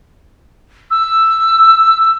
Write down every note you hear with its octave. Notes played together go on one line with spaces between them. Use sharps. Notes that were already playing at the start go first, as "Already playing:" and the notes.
E6